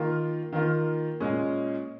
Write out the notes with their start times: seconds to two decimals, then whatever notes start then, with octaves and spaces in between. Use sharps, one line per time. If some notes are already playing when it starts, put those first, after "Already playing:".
Already playing: D#3 A#3 F4
0.53 D#3 A#3 F4
1.20 A#2 G#3 C#4 G#4